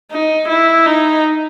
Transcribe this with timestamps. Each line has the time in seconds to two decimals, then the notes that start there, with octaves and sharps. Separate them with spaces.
0.11 D#4
0.49 E4
0.86 D#4